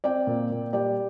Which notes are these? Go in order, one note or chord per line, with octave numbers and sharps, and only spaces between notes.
C4 D5 G5
A#2
A#2
G3 D5 G5